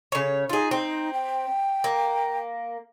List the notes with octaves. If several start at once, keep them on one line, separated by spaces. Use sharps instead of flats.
C#3 C#5
D#4 F4 G#4
C4
G5
A#3